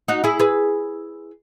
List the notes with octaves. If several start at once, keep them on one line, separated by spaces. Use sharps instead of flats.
D#4 F#4
E4 G#4
G#4 B4